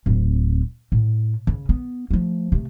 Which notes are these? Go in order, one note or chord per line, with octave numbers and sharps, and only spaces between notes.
D1 C4
A2
C#3
B3
F3 A3
C3 A3